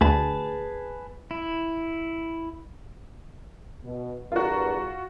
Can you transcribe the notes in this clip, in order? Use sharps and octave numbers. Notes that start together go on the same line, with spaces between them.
D2 G#4 B4 A5
E4
B2
E2 G2 F4 F#4 A#4